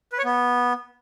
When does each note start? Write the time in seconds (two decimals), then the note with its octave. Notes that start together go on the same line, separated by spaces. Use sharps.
0.12 B4
0.19 C#5
0.25 B3